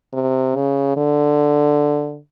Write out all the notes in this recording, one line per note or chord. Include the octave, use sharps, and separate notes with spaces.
C3
C#3
D3